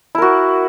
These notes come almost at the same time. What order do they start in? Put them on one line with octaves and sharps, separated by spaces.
E4 A#4 F#4